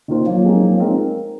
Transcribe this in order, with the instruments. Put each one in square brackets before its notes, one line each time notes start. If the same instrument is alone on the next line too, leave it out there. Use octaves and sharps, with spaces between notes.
[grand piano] D#3 A#3 F4 C5
[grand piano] F3 [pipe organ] F#3 A#3
[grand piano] G#3 C4 D#4 A#4
F3
G#3 C4 D#4 A#4